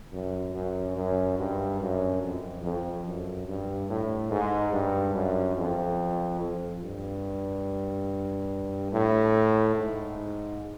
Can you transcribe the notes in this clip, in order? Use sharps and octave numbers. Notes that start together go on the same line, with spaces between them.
F#2
F#2
F#2
G2
F#2
F2
F2
F#2
G2
A2
G#2
G2
F#2
F2
F2
G2
A2
G#2